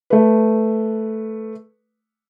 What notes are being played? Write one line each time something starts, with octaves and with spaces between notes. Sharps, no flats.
A3 B4